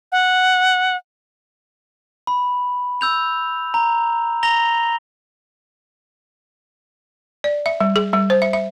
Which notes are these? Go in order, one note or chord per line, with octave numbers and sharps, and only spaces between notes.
F#5
B5
E6 G6 F7
A#5
A#5 A#6 F7 G7
D5
E5
G3
G#4
G3
C5
E5
E5